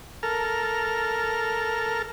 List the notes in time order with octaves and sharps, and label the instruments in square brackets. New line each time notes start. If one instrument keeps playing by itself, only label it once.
[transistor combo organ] A4 A#4 F6